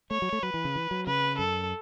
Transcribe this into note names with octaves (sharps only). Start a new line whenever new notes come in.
A3 C#5
F#3
A3
F#3 B4
E3
C#3
E3
F#3
C#3 B4
F#2 A4